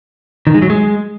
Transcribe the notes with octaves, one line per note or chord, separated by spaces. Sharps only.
D#3
G#3
F#3
G#3